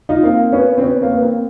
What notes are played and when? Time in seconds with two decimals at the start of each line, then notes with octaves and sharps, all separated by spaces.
0.09 D#4 F4
0.23 A#3 C4
0.52 B3 C#4
0.78 C4
0.82 B3 C#4
1.01 A#3 C4
1.12 B3
1.21 A#3 C4